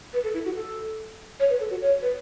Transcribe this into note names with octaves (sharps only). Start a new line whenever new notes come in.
B4
A4
E4
F#4
A4
C#5
B4
A4
F#4
C#5
B4